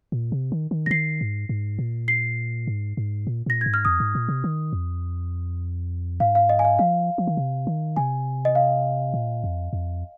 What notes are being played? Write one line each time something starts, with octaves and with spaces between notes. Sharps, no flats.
A#2
C3
D#3
D#3
C3 A#6
D#3 C7
G#2
G#2
A#2
C7
G#2
G#2
A#2
A#2 A#6
G#2 G#6
F6
F2 D#6
G#2
A#2
C3
D#3
F2
G#2 F5
F5
D#5
G#5
F5
F3 F5
F3
D#3
C3
D#3
C3 G#5
D#5
F5
A#2
F2
F2